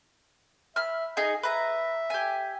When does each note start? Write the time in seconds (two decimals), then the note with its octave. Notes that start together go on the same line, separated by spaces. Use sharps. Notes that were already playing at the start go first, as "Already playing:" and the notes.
0.76 E5 B5 F6
1.17 D#4 G#4 D#5
1.43 B4 E5 A#5
2.10 G4 G#5